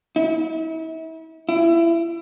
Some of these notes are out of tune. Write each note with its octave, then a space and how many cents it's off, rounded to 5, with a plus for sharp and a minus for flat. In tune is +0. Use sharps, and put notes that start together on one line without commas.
E4 -35
E4 +25